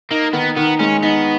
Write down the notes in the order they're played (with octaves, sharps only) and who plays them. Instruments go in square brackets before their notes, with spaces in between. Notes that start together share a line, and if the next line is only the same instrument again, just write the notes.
[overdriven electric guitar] A#3 [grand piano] D#4
[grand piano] D#3 [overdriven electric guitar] B3
[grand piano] D#3 [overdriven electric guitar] B3
[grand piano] G#3 [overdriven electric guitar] C#4
[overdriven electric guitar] B3 [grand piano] D#4